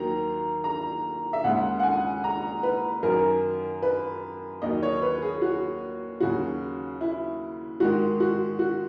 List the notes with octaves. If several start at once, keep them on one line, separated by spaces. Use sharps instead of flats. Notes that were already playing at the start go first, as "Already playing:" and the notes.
Already playing: D#2 D#3 F#3 A#5
A#5
E5
D#2 C#3 G#3 F#5
F#5
G#5
A#5
B4
F#2 D#3 F#3 A#4
B4
D#2 D#3 F#3 D#5
C#5
B4
G#4
F#4
D#2 C#3 F#3 F#4
E4
G#2 D#3 G#3 F#4
F#4
F#4